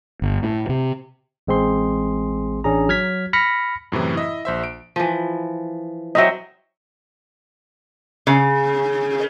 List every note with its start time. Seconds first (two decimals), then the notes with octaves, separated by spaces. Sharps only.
0.22 G1
0.43 A2
0.69 C3
1.48 A1 G#3 C4 G#4 C6
2.64 A1 C#4 D4 G#4 A#5
2.89 F#3 F6 G#6 B6
3.33 B5 F6 A#6 B6 C#7
3.92 F#2 A2 C3 E3
4.15 E4 D#5 E5
4.45 A#1 C5 E5
4.64 D7
4.96 E3 F3
6.15 F#3 C4 D#4 D#5 E5
8.27 C#3